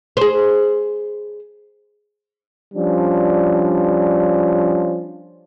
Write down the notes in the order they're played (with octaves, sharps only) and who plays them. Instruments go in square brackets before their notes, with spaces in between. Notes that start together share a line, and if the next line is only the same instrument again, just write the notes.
[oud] G#4 C5
[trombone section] F3 G3 C#4 D4